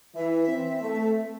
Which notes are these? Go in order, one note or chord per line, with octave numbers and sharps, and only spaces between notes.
E3 E5
C4
A3